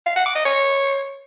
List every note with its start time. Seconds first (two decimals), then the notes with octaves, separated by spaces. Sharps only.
0.06 F5
0.16 F#5
0.26 D6
0.35 D#5
0.45 C#5